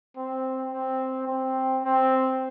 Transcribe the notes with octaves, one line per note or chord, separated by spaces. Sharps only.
C4
C4
C4
C4